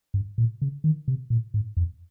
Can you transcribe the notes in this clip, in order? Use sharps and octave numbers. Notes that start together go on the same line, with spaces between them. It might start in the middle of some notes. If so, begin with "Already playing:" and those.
G2
A#2
C#3
D#3
C3
A#2
G#2
F2